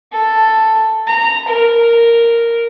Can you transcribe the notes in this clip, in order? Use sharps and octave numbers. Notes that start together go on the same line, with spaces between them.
A4
A#5
A#4